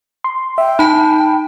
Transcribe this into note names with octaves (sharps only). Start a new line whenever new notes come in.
C6
E5 G5
D#4 A5 B5